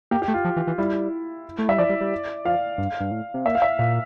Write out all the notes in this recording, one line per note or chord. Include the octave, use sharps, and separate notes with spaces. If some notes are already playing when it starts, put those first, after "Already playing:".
A#3 G4
G4
A3
F4
F3
E3
E3
G3 E4
A3
G3 E5
F3 D5
G3
G3
F3 F5
G2
G2
A2
C3
A#2 E5
F5
E5
A#2 F5